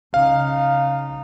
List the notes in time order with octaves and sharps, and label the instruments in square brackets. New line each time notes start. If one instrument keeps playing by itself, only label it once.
[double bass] C#3 D#4 [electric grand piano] F5